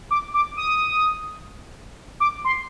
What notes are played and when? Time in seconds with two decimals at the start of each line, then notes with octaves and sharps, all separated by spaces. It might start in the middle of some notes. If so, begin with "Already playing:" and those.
0.11 D6
0.34 D6
0.57 D#6
2.20 D6
2.45 C6